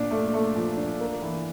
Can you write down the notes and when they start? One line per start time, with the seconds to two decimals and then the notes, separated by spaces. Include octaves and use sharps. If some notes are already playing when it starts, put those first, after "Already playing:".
Already playing: A#2 D4
0.11 A3
0.34 A3
0.56 F3
0.77 D4
1.00 A#3
1.22 E3